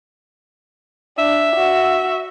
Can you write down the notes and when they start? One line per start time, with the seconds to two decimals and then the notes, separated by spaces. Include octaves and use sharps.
1.18 D4 E5
1.56 F#4